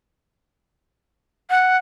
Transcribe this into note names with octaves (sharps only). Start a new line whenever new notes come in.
F#5